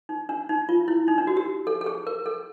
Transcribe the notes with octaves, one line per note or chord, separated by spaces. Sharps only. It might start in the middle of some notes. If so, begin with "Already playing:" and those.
D#4
D4
D#4
F4
E4
D#4
D4
F#4
G4
A4
A4
G#4
A#4
A4